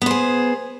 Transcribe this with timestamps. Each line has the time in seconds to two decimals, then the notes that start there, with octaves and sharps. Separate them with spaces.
0.02 B3
0.06 C5
0.11 G#4